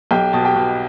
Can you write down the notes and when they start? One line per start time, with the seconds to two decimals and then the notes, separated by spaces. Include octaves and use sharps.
0.11 B1 G4 G5
0.33 B2 A5
0.45 G4 G5
0.55 B2